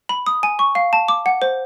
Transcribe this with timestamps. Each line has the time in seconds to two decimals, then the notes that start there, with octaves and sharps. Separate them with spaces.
0.09 B5
0.27 D#6
0.43 G#5
0.59 C#6
0.75 F5
0.93 A5
1.08 D6
1.26 F#5
1.42 C5